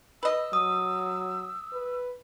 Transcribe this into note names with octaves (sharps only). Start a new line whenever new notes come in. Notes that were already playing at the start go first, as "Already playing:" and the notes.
B4 D#5 E6
F#3 D#6
B4